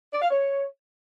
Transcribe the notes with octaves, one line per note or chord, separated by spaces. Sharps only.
D5
F5
C#5